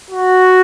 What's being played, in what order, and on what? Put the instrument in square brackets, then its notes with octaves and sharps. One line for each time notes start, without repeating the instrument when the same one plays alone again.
[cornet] F#4